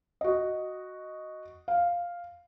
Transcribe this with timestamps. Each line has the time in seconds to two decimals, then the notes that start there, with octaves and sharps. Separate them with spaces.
0.21 F#4 D#5
1.68 F5